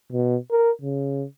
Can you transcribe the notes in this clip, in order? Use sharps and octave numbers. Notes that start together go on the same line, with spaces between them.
B2
A#4
C#3